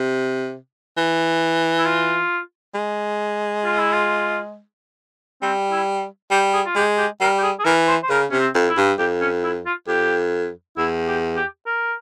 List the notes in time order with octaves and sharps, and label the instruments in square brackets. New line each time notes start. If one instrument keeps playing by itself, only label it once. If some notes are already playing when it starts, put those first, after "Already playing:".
Already playing: [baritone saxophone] C3
E3
[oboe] E4
F4
[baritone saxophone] G#3
[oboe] F4
E4
F4
[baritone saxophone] G3 [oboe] C4
[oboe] E4
[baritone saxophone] G3 [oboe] G4
[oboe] G#4
F4
[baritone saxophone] G#3 [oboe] G4
[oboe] G4
[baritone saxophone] G3 [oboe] A#4
[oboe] G4
G#4
G#4
[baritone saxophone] E3 [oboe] A#4
[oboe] C5
C5
[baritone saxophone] C#3 [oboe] A#4
[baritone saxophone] C3 [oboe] C#4
[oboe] C4
[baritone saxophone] F2
[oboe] E4
[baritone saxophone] G2
[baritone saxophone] F2 [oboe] G4
[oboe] C#4
E4
F4
[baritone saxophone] F2 [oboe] G4
[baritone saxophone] E2 [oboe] E4
[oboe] G4
G4
A#4